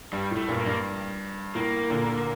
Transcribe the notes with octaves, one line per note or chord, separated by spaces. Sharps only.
G2 G3
A2
A3
G2 A#2
A#3
G2
A2 A#3
A#2 D3